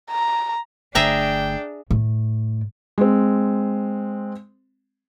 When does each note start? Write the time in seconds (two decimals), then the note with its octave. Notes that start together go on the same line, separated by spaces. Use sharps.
0.11 A#5
0.95 G1 D3 A3 D4 G#4 E5 G5 A#5
1.91 A2
2.98 G#3 C4